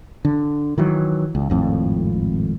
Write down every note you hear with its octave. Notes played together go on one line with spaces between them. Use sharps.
D3
D#3 E3 F#3
C#2
G#1 F2 A2